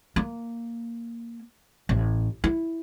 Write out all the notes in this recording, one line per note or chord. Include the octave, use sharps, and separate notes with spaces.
A#3
A1
E4